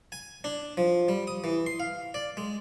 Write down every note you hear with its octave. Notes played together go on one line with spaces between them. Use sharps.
G#5
D4
F3
G3
D#6
E3
C6
F5
D5
G#3